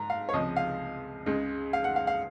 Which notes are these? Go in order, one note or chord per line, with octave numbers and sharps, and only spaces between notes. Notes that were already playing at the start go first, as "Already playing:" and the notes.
Already playing: G#2 A#5
F5
C#5
C#2 C3 F3 G#3 D#5
F5
C#2 C#3 G#3
F5
F#5
F5
F5